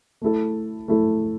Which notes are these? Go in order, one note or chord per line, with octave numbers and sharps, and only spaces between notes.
A3 E4 A4
A3 E4 A4